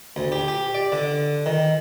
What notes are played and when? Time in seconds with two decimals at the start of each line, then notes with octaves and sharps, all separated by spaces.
0.16 D2
0.32 G4
0.48 G4
0.74 D5
0.92 D3
1.46 D#3